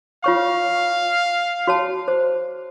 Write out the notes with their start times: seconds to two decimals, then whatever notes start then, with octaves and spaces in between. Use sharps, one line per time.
0.24 F4 C#5 F5 C#6
1.67 F#4 C#5 A5
2.08 C5